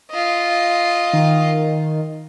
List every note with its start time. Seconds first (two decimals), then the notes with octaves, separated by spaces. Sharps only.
0.11 F4 D#5
1.13 D#3